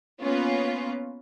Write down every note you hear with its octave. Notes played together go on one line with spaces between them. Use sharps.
A#3 B3 C#4 F4